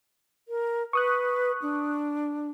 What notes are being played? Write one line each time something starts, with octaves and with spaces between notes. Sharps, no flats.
A#4
B4 C#6 D#6 F#6
D4